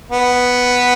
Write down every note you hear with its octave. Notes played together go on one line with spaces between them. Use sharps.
B3